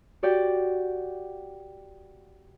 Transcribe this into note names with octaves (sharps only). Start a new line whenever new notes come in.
F#4 G4 D5 F#5 G5